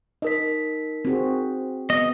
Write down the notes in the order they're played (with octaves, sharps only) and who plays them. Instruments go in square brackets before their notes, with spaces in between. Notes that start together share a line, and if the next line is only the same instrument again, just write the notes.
[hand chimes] D#4 A#4 B6 [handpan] D#5
[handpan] C4 F#4 G#4
[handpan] B3 [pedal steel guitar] D#5